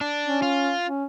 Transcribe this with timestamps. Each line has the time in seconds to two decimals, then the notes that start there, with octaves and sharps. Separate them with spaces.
0.01 D4
0.25 C#4
0.42 F4
0.86 C#4